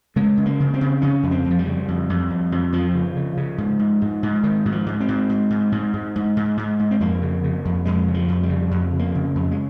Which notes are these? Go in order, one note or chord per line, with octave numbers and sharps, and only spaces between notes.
C#3 G#3
C#3
A#3
C#3
C4
C#3
C#3 C#4
F2
C4
F2
F3
G3
C#3
F2
F2
F2
F2
F2 F3
C#3
C#3
C#3
G#2
G#2
G#2
G#2
G#2 D#3
G#2
F3
G#2
C4
G#2
G#2
G#2
G#2
G#2
G#2
G#2
G#2
G#2
C4
F2 A#3
C#3
C#3
F2
F2 G#3
C#3
F3
F2
G3
C#3
F2
C#3
A#3
C#3
F2
G#3